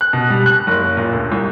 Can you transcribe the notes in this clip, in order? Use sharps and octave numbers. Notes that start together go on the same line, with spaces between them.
F#6
B2
G3
F#6
F#1
A#2
D2
C2